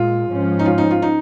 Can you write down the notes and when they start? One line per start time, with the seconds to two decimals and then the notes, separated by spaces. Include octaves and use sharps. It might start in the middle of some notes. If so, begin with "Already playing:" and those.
Already playing: A#2 G#3 F4
0.28 G#2 F3 C#4
0.59 D#4
0.65 F4
0.78 D#4
0.90 F4
1.02 D#4